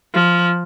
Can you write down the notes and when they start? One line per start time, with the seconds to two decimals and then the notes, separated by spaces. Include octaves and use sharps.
0.14 F3